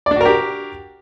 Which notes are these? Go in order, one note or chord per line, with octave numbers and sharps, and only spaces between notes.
D4 F#4 G4 A#4 D5